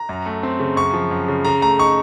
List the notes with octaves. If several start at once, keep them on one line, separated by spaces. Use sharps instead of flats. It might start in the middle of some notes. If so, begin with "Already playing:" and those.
Already playing: A#5
F#2
A3
C4
C#3
F#2 C#6
F3
F#2
C#3
C#3 A#5
A3 A#5
D#4 C#6